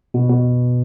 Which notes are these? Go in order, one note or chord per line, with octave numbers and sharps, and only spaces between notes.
B2
B2